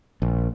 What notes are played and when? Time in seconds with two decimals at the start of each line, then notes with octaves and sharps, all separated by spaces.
0.22 A#1